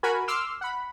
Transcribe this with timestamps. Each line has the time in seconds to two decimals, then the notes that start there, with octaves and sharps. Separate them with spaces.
0.03 F#4 A#4 G#5 B5
0.28 C6 D6 E6 F6 C7
0.61 F#5 B5